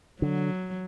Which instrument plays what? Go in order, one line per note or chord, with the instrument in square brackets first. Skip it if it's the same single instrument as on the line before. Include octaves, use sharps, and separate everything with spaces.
[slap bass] D3 [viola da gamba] F#3